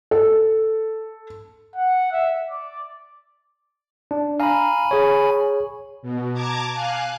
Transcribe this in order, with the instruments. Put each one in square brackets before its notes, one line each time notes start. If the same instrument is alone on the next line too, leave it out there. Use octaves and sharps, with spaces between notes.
[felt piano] A4
[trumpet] F#5
E5
D5
[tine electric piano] D4
[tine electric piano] F5 A#5 [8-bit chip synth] G#5 B5
[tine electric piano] G#4 C#5
[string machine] B2
A5 A#5 D6 G#6
F5 G#5 F#6